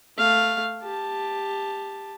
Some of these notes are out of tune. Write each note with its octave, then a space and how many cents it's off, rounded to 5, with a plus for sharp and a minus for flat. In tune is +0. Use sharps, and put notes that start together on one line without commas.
A3 +5 F5 +0
G4 +15 A5 +0